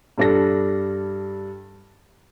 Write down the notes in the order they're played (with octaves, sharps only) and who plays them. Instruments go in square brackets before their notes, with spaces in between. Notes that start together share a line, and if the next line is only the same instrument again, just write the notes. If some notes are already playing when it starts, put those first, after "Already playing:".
[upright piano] G2 G3 D4 A4 A#6